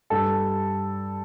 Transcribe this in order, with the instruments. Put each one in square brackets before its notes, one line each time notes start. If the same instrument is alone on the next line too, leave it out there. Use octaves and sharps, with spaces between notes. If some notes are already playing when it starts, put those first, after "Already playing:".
[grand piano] G2 G3 A4